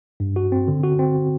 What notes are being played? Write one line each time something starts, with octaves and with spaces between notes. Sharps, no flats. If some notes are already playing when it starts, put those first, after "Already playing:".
G2
F#4
C4
D3
F#4
C4